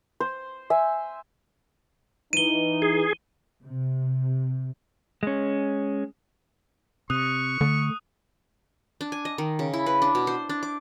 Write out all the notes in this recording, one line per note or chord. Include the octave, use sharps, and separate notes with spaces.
C5
E5 G#5
E3 D#4 D#7 G7
G#4
C3
G#3 C#4
C3 C#6 D#6 F#6 D#7
D3 A3
D4
G#5
D#5
D#3
C#3
E4
B4
D4
B2
C5
D4
D6